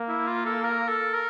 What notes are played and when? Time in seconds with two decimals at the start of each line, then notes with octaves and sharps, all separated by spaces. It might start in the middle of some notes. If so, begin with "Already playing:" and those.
Already playing: A#3
0.08 E4
0.27 F4
0.45 A4
0.64 A#4
0.89 A4
1.14 A#4